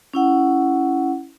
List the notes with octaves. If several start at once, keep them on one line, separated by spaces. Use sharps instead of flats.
C#4 E4 F#5